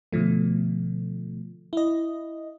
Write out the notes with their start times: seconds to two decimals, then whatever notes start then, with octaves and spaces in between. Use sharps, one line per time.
0.12 B2 D3 F3 A3
1.73 E4 D#5